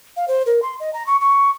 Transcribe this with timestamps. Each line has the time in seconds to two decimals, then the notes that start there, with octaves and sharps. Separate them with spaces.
0.17 F5
0.28 C5
0.46 A#4
0.63 C6
0.80 D#5
0.93 A#5
1.07 C#6
1.21 C#6